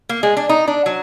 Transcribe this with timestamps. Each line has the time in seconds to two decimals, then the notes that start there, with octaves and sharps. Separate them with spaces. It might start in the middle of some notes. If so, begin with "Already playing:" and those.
0.09 A#3
0.23 G#3
0.37 D4
0.49 D#4
0.67 D4
0.86 F#3